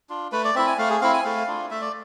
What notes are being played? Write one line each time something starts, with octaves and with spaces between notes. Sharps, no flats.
D4 F4
A3 B4
D5
C4 E4 E5
G#5
A3 F5
G#4
C4 E4 F5
G#5
A3 F5
D4 F4
A3 E5
D5